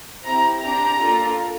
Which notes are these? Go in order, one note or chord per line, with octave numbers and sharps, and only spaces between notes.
C4 E4 G4 A#5
D4 G4 A#5
A#3 D4 F4 A4